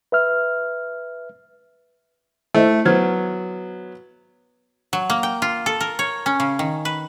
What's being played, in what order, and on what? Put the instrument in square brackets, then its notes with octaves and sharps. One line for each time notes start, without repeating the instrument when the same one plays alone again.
[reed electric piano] B4 E5 F6
[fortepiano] A3 [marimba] E4 C5 D#5
[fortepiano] F#3 B3 [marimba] C5 F6 G#6
[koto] F#3
A#3
G5
F4
A4
A#4
C#5
C#4
C#3
D#3
B4